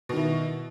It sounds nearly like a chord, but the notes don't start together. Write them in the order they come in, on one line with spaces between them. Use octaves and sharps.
B2 D#3 E4